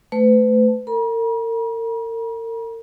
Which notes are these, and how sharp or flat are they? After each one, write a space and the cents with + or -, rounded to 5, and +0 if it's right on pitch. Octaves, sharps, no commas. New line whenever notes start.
A3 +0 B4 +40
A#4 -40 A#5 +45